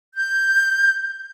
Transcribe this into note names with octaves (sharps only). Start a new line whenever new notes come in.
G6